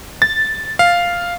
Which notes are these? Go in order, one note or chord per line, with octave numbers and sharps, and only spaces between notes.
A6
F5